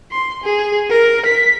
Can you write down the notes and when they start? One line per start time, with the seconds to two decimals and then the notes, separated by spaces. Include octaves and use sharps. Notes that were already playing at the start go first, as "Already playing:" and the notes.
0.11 C6
0.43 G#4
0.90 A#4
1.25 B6